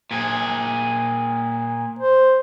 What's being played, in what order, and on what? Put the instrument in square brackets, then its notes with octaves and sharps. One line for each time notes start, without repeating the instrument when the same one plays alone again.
[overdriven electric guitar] A#2 G#4
[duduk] C5